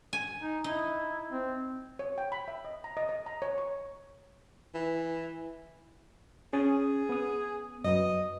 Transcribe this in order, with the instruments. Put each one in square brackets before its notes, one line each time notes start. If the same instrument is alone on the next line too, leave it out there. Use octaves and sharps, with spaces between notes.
[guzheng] G#5
[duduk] D#4
[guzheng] D#4 [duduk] E4
[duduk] C4
[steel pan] C#5
G5
B5
E5
D#5
A#5
D#5
D#5
A#5
C#5
C#6
[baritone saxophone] E3
[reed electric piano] C#4 D#6 A6 [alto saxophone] G#4
[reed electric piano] B3 D#6
[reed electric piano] F#2 F#3 B4 [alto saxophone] D#5